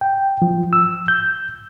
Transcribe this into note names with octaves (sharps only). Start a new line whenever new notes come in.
G5
F3
E6
G6